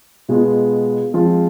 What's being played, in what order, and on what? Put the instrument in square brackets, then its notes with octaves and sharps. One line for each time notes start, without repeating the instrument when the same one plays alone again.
[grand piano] B2 G#3 B3 F4
F3 G#3 C4 F4